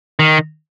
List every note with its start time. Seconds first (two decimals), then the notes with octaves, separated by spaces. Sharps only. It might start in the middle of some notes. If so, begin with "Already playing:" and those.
0.19 D#3